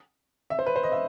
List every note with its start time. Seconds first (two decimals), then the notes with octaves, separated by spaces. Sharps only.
0.50 E5
0.59 C5
0.66 B4
0.76 C5
0.83 D#5
0.92 E5